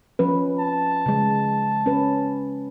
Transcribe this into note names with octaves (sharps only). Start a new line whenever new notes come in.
F3 C#4 B4
A5
C#3 G#3
C#4 B4